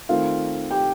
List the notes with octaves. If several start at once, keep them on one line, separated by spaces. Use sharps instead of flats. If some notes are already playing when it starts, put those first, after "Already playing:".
D#3 A3 C4 F4 F5
G4 G5